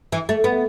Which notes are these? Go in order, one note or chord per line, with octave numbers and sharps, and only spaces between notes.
E3
A3
B3